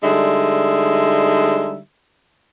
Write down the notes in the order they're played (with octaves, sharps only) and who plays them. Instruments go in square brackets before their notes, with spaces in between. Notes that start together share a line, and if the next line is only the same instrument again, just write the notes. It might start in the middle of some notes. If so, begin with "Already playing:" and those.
[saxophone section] D3 G3 G#3 D#4 E5